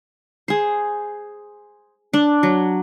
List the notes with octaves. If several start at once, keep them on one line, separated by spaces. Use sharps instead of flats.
G#4 C5
D4
F#3